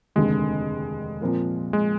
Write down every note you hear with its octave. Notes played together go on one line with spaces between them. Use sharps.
F1 D#2 D3 G#3
A#2 F3 C4 F4 A#4
G#3